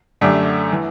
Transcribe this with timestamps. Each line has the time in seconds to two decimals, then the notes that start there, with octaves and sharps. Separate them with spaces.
0.21 F#2 D3 A3 D4 G4
0.73 E3